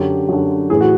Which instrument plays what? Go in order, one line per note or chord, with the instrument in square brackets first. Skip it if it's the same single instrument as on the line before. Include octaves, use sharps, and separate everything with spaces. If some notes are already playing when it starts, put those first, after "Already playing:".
Already playing: [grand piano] F#2 D3 G4
F#2 D3
A2 E3 G#4
F#4